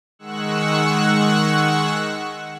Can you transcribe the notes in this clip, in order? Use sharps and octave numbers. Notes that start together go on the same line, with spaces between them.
D#3 G#3 F#5 C#6 E6 F#6